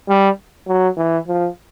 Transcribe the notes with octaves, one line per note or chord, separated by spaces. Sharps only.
G3
F#3
E3
F3